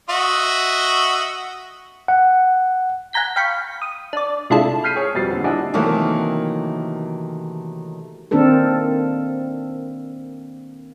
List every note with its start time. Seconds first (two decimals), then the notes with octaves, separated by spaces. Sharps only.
0.09 F#4 D#5 E5
2.08 F#5
3.13 F#5 G#5 A#5 G6 B6
3.36 F5 G5 B5 C#6
3.82 D#6
4.13 D4 D5
4.50 C3 G#3 D4 E4 F4 A4
4.84 F6 G6 B6 C7 D#7
4.96 G#4 C#5
5.14 F2 B2 G3 A6 C7
5.30 D#1 D3
5.44 D4 E4 F4 D#5 F#5 G#5
5.74 C3 D#3 E3 F#3 A3 A#3
8.31 D#3 A#3 C4 D4 A4 A#4